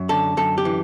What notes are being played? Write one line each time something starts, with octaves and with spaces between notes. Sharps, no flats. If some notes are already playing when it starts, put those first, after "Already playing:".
Already playing: F#2
D3 A4
F#2 A4
G4
E3